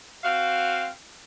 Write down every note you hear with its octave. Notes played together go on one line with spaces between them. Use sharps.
C4 F#4 F5